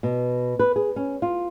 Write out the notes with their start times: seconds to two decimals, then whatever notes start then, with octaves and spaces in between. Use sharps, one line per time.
0.03 B2
0.59 B4
0.76 G#4
0.96 C#4
1.22 F4